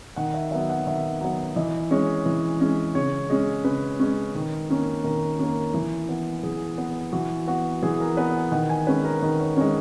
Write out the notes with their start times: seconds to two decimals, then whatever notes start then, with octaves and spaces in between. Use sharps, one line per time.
0.16 D#3 F#5
0.34 E5
0.51 F#3 B3 E5
0.70 F#5
0.87 D#3 E5
1.21 F#3 B3
1.56 E3 D#5
1.91 G#3 C#4 C#5
2.26 E3
2.61 G#3 C#4
2.95 C#3 C#5
3.30 G#3 C#4
3.65 C#3 B4
4.00 G#3 C#4
4.35 D#3
4.69 A#3 C#4
5.04 D#3 A#4
5.40 A#3 C#4
5.74 E3
6.09 B3
6.43 E3 G#4
6.78 B3
7.12 E3 F#4
7.48 B3 F#4
7.82 E3 G#4
8.00 A#4
8.17 B3 B4
8.52 D#3 F#5
8.70 G#5
8.87 G#3 C#4 B4
9.04 A#4
9.22 D#3 B4
9.40 C#5
9.57 G#3 C#4 C#5